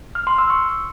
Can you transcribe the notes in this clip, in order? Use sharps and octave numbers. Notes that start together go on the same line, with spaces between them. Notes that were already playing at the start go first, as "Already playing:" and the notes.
F6
C6
E6
C#6